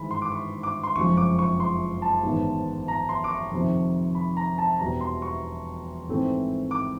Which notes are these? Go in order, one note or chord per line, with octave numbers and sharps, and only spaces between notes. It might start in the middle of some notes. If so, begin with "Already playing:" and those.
Already playing: G#1 G2 E3 G#3 B5
C6
D6
C#6
D6
C6
F#1 F2 C#3 F3 G#3 C#6
D6
C#6
C6
A5
A1 G#2 D#3 G#3 B3
A#5
C6
D6
C#6
F2 C3 D#3
B5
A#5
A5
E1 E2 B2 G3 B3 A#5
C6
C#6
A1 G#2 E3 A3 C4
D6